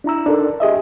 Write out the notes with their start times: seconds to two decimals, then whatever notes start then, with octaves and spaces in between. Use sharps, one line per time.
0.04 D4 E4 A#5 E6
0.26 D4 D#4 A4 A#4 D5
0.60 G4 G#4 D#5 E5